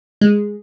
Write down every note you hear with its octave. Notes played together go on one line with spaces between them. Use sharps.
G#3